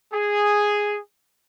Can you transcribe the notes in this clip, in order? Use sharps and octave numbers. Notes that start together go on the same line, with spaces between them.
G#4